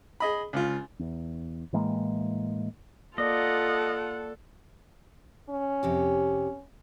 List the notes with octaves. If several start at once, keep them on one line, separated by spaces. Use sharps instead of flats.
G#4 D#5 B5
C#2 F4
E2
A2 E3 G#3 A#3
A#3 F4 A4 D5 D#5 F#5
C#4
F2 C3 G4